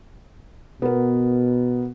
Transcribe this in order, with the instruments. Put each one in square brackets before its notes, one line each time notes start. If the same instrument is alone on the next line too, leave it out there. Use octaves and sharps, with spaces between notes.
[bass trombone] B2 [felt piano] B3 A#4